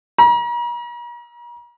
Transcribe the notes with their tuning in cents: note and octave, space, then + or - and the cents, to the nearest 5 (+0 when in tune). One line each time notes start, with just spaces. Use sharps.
A#5 +40